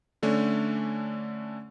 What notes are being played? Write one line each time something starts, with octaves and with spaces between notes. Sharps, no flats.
D3 A3 C#4 D4